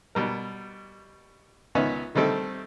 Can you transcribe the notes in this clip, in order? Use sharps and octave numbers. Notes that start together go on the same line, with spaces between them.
B2 G3 A#4
C#2 D#3 B3 C#4 E5
D3 D#3 G3 A3 C4 A4